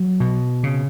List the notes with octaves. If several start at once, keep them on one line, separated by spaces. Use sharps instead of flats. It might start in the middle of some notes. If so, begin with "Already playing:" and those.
Already playing: F#3
B2
C#3